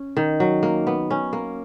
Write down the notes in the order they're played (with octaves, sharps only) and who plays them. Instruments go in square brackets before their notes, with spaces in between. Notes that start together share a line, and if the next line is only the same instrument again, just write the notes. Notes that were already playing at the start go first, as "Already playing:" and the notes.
Already playing: [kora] C#4
D#3
F#3
A#3
B3
C#4
A#3